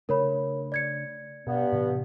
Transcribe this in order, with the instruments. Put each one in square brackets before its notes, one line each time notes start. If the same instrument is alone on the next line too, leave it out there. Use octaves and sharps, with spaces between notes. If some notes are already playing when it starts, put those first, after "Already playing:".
[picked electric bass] C#3 A3 D4 [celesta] A#4 C#5 B5
[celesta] D5 G#6 C#7
[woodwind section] G2 B3 [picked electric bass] B2
[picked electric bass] A2 C3 E3